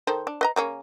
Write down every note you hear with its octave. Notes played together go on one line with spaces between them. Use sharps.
D#3 A4 C5
D4
B4 D#5 A#5
C#3 A#3 C#4